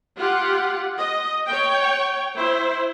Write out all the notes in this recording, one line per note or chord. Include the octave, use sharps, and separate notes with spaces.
F4 G4 F#5
D#5
C#5 G5
E4 C5